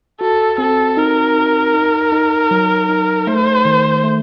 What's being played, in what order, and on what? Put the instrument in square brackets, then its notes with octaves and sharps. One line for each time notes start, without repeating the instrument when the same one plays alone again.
[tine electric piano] F#4 [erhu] A4
[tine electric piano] C4 [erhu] A4
[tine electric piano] D#4 [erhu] A#4
[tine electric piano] D#4
D#4
D#4
F#3
D#4
[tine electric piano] A3 [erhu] C5
[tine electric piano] D#3
A3